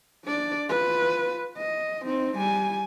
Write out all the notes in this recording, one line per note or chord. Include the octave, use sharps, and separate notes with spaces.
D4 D5
F4 B4
D#5
C4 D#4
G3 G#5